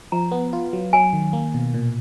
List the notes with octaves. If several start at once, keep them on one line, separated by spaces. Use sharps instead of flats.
F3 A#5
B3
F4
F#3
F#3 G#5
D#3
A#3
B2
A#2